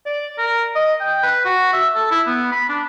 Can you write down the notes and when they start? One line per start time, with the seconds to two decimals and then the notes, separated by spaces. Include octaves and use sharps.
0.06 D5
0.38 A#4
0.76 D#5
1.00 G5
1.23 B4
1.45 F#4
1.73 E5
1.95 A4
2.11 E4
2.27 B3
2.52 B5
2.69 D4